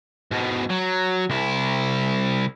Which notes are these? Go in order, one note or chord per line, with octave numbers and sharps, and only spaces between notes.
G#2 B2
F#3
C2 E4